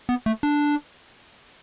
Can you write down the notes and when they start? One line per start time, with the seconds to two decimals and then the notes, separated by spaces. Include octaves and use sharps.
0.09 B3
0.26 A3
0.43 D4